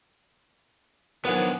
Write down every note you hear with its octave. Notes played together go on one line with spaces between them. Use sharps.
D#3 F3 F#3 B3 D4 B4 F#5 G#5